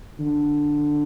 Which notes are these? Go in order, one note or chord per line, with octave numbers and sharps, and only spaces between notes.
D3